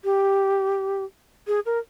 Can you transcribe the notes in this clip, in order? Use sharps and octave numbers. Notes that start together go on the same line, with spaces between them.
G4
G#4
A#4